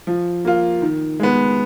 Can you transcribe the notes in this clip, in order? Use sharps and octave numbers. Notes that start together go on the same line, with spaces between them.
F3
A#3 F4
D#3
G#3 B3